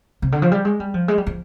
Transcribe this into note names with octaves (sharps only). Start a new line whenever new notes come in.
C3
D3
F3
G3
G#3
G3
F3
G#3
G3
F3